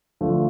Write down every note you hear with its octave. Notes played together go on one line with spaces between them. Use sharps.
D3 F3 A3